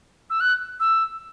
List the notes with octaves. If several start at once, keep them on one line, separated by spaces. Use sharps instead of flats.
E6
F#6
E6